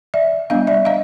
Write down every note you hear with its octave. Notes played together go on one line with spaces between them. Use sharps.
D5 E5
G3 B3 D4 D#5 F5
D5 E5
D#5 F5